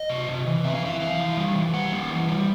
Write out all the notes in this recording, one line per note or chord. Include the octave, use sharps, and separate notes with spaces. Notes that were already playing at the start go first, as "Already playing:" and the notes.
Already playing: D#5
C3
C3
E3
C4 E5
F5
E3 E5
E3 F5
E3
G3
E3
G3 F#5
A#3
E3
G3